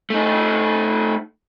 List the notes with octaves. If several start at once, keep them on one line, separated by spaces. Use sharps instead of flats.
A3 D#4